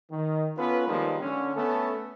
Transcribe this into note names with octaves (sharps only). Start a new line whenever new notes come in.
D#3
B3 C#4 F4 A4 B4
D#3 F3 G3 G#3 A#3 D#4
D3 C#4
A3 B3 C#4 A4